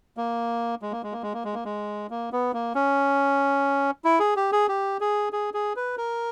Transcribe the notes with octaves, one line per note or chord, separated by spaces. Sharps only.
A#3
G#3
A#3
G#3
A#3
G#3
A#3
G#3
A#3
G#3
A#3
B3
A#3
C#4
E4
G#4
G4
G#4
G4
G#4
G#4
G#4
B4
A#4